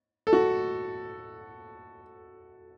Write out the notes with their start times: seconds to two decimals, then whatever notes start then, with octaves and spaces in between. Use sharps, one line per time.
0.27 A4
0.33 F#4